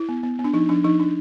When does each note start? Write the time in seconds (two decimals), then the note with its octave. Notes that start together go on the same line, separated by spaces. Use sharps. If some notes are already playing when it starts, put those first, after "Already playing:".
Already playing: E4
0.09 B3
0.23 B3
0.39 B3
0.44 D4
0.54 F3 D#4
0.69 F3 D4
0.84 F3 D#4
1.00 D4